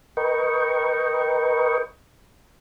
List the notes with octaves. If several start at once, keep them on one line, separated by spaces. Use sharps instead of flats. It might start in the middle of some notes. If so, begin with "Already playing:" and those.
A#4 B4 D#5 G5 C#6